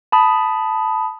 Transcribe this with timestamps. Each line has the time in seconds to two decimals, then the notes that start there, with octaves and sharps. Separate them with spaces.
0.12 A5 B5 D#6